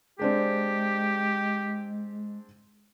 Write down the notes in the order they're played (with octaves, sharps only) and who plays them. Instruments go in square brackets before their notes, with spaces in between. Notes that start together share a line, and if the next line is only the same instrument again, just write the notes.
[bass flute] G#3 [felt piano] C4 D4 G#4 [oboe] G4